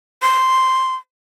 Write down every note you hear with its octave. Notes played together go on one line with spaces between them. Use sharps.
C6